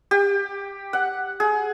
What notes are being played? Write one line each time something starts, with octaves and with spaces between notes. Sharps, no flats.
G4
F#5
G#4